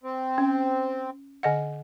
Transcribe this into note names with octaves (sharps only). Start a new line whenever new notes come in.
C4
C#4
D3 D#5 F#5